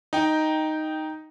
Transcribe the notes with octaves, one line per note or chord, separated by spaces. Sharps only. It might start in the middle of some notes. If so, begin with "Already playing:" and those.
D#4 G5